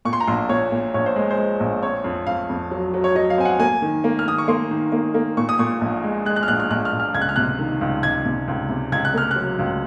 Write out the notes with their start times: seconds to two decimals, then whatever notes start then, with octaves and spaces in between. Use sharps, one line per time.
0.05 A#2 C#6
0.13 C6
0.20 A#5
0.27 A#1 C6
0.49 A#2 C#5
0.72 A#2
0.94 A#1 C#5
1.06 C5
1.16 G#3
1.30 C5
1.38 G#3
1.60 A#1
1.83 C4 C#5
2.04 F2
2.27 F2 F5
2.49 F2
2.71 F#3
2.94 F#3
3.04 C#5
3.15 F#3 D#5
3.30 F5
3.38 C4 G#5
3.45 F#5
3.60 A#3 G#5
3.82 D#3
4.04 A#3
4.19 F6
4.26 D#3 D#6
4.38 C#6
4.48 A#3 C6
4.71 D#3
4.92 A#3
5.14 A#3
5.37 A#2 C#6
5.49 D#6
5.59 A#2 C#6
5.81 A#1
6.04 G#3
6.25 G#3 F#6
6.36 F#6
6.43 F6
6.48 A#1 F#6
6.60 F6
6.70 A#1 F#6
6.85 F6
6.92 A#1
7.00 F6
7.14 C#2 G#6
7.21 F#6
7.29 F6
7.36 C3 F#6
7.59 D#3
7.81 C#2
8.03 C#2 G#6
8.26 C3
8.48 C#2
8.69 C3
8.92 C#2 G#6
9.05 F#6
9.14 A#3 F6
9.31 F#3 F#6
9.59 C#2